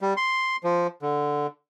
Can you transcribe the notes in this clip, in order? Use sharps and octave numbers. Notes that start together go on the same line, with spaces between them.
G3
C6
F3
D3